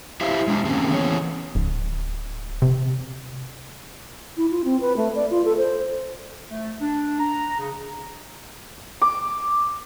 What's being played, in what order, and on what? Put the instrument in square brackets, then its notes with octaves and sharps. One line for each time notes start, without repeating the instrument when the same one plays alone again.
[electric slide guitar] E4 G4 C5 E5 F5
G#3 D4
D#3 A#3 C4 C#4 G#4
E3 B3 C#4 G#4 C#5
[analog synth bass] D1
C3
[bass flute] E4
F4
C4
B4
A3
D5
F4
A4
C5
[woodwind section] A3
D4
A#5
C#3
[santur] D6